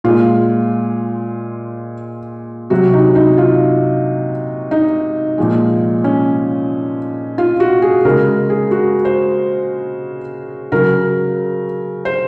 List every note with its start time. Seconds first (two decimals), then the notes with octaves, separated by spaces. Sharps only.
0.04 A#2 G#3 F4
2.70 C3 F#3 F#4
2.93 D#4
3.15 D#4
3.38 F4
4.71 D#4
5.38 A#2 F3 G#3
6.04 C#4
7.38 F4
7.60 F#4
7.82 G#4
8.05 C#3 G#3 A#4
8.50 G#4
8.71 F#4
9.05 C5
10.72 C#3 F#3 A#4
12.05 C5